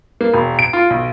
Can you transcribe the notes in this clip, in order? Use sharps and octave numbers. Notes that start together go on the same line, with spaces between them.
A#3
E1
D7
F4
B1